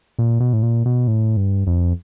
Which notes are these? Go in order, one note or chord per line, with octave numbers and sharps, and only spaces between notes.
A#2
B2
A2
A#2
B2
A2
G2
F2